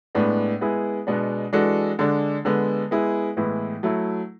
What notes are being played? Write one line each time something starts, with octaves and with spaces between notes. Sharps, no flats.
A2 G#3 B3 D4
G#3 B3 E4 G#4
B2 G#3 B3 D4
E3 G#3 D4 F#4 A4
D3 G#3 D4
D3 G#3 B3
G#3 B3 E4 G#4
A2 E3 G#3 B3 E4
F#3 A3 E4